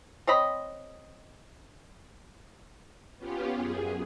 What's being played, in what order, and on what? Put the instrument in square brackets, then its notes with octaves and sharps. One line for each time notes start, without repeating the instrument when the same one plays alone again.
[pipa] C4 C#5 D#5 B5
[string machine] B3 C#4 F4 G4
F#2 G#4